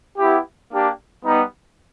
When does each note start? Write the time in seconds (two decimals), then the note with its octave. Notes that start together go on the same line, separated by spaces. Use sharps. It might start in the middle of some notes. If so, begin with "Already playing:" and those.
0.18 B3 E4 G4
0.70 A#3 D4 G4
1.22 G3 B3 D#4